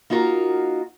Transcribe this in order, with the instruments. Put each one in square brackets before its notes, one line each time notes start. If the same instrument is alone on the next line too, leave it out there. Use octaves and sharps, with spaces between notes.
[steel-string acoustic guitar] A#3 D#4 F4 F#4 A#4